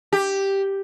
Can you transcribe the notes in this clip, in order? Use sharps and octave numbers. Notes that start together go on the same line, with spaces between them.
G4